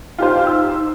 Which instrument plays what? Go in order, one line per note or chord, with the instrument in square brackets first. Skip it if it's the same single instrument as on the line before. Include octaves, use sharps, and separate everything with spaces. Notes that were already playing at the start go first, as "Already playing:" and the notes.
[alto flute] D#4 [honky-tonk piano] F4 G4 C5
[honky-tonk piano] E6